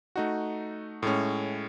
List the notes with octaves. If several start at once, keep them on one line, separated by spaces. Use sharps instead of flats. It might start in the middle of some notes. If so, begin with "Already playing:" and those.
A3 D#4 F#4
A2 G#3 C#4